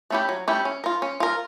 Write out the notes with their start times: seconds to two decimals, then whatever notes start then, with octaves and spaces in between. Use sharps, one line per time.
0.10 A3 C#4 E4 G4
0.29 F#3
0.48 A3 C#4 E4 G4
0.65 C#4
0.84 F4 A#4
1.02 C#4
1.20 F4 A#4